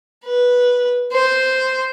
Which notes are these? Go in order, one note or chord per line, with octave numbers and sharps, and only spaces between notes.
B4
C5